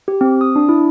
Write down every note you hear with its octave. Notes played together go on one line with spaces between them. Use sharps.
G4
C4
D#6
D4
E4